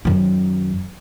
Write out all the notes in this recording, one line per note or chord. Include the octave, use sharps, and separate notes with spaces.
F#2 D#3